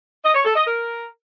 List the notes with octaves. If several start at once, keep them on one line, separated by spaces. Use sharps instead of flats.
D#5
C#5
A4
D#5
A#4